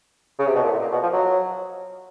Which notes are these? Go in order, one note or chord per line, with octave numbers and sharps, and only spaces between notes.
C#3
C3
B2
A#2
A2
A#2
B2
F3
F#3